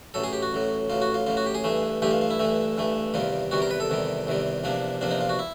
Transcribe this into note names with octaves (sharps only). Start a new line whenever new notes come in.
A1 A2 F#3 A4
G#4
G4
F#4
A1 A2 F#3
A1 A2 F#3 F4
F#4
F4
A1 A2 F#3 F4
F#4
G4
G#4
G2 E3 A3
G2 E3 A3 G4
F4
F4
E4
G2 E3 A3
G2 E3 A3
E2 C3 D#3 G3 F4
E2 C3 D#3 G3 F#4
A#4
B4
A4
E2 C3 D#3 G3
E2 C3 D#3 G3
E2 C3 F3 A#3 D4
E2 C3 F3 A#3 D4
D#4
F4
F#4
E4